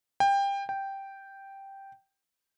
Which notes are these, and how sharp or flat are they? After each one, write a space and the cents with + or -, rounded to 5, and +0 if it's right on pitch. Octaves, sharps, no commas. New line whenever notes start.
G5 +20
G5 -5